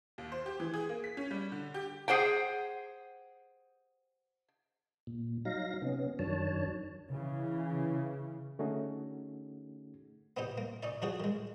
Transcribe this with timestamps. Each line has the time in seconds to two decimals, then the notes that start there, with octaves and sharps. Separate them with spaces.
0.18 D#2
0.32 C5
0.46 G4
0.60 E3
0.74 G#4
0.89 A#3
1.04 B6
1.17 C#4
1.31 G3
1.52 D3
1.74 G4
2.08 G#4 C5 F#5 G5
5.07 A#2
5.45 F#3 D#4 F5 A#6
5.82 C3 B3 C#4
6.19 F#2 D#3 F#3 D4 C#5 A5
7.09 C#3 E3
8.59 D3 A3 C#4 D#4 F#4 G#4
10.37 B3 C4 D#4 G4
10.58 A#3
10.83 C#4 D#4 D5
11.02 F2 C#3 F3 F#4 G#4 C#5
11.20 D#3 G#3